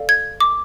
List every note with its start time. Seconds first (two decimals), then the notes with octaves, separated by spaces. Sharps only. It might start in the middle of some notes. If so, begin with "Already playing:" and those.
Already playing: A4 D5 F5
0.09 G#6
0.40 D6